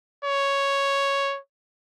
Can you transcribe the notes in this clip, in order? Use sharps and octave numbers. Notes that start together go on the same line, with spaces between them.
C#5